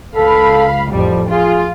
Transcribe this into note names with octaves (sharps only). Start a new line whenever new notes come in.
C#2 A4 F5 B5
A1 F2 F3 G3
F4 G#4